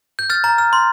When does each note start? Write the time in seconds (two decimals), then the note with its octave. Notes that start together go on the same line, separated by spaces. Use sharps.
0.19 G6
0.30 F6 A6
0.44 A#5
0.58 F6
0.73 C6